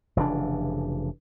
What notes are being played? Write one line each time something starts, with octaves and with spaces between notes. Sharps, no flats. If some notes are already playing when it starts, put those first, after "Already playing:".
F1 C#3 E3 D4